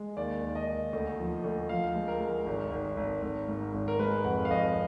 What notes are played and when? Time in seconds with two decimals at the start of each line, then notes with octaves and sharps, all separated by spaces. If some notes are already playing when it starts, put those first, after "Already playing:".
Already playing: G#3
0.17 D#2 D5
0.43 D#3
0.55 D#5
0.68 D#2
0.93 D2
1.19 F3
1.44 D2
1.69 F3 F5
1.95 G#3
2.08 A#4
2.20 G#3
2.46 G#1
2.72 G#1
2.97 G#1
3.23 G#1
3.48 G#2
3.74 G#1
3.88 A#4
3.99 G#3 B4
4.24 F2 F#5
4.45 F5
4.50 F2 D#5